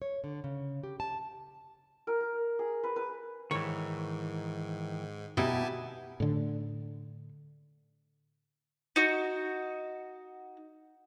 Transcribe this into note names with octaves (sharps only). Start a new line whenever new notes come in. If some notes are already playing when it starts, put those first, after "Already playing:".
C#5
D3
C#3
G4
A5
A#4
A#4
G#4
B4
B4
G#2 D#3 E3 C#5
B2 G3 D#4 E4 G4 G#5 A5
A2 D3
D#4 F#4